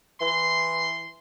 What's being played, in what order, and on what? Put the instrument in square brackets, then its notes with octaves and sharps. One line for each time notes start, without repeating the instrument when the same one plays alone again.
[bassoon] E3 [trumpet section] C6